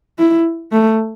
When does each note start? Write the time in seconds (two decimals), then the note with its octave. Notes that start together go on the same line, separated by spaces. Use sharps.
0.19 E4
0.72 A3